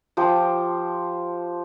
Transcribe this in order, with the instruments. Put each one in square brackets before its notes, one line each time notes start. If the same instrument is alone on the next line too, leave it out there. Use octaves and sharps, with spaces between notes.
[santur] F3 G4 C5